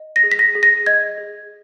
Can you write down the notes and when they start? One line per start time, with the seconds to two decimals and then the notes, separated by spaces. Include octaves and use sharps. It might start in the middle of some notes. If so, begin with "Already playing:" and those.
Already playing: D#5
0.16 A#6
0.23 G#4
0.32 B6
0.39 A#6
0.55 G#4
0.63 A#6
0.86 D#5 G#6
1.18 G#4